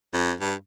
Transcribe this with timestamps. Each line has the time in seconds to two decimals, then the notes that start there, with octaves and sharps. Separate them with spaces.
0.13 F2
0.41 G2